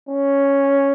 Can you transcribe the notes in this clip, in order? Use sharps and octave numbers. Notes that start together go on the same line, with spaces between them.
C#4